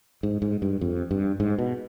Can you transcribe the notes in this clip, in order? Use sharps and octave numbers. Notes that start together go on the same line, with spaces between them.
G#2
G#2
G2
F2
G2
G#2
B2